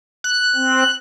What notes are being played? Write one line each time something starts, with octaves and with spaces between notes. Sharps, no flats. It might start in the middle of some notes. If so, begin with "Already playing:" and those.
F#6
C4